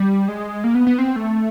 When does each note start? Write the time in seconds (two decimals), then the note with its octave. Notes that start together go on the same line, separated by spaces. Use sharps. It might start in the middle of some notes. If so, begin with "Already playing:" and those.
Already playing: G3
0.28 G#3
0.64 A#3
0.75 B3
0.87 B3
0.99 C4
1.16 A3